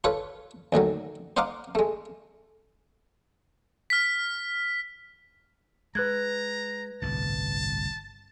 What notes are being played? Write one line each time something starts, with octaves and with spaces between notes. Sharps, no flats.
F4 A4 B4 C#5
D2 A2 D#3 F#3
C5 D#5 F5 F#5 A#5 D6
G#3 A3
F6 B6
G#3 B4 A#5 F#6 G#6
G1 C2 A2 A5